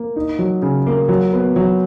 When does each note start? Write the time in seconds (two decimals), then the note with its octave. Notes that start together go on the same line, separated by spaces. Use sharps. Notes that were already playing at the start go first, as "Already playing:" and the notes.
Already playing: A#3
0.16 D#4
0.39 F#3
0.62 C#3
0.86 A#3
1.09 F#3
1.33 B3
1.56 F#3